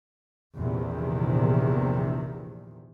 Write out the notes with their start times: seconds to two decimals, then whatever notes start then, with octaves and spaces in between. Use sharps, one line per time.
0.55 A#1 E2 C3 D#3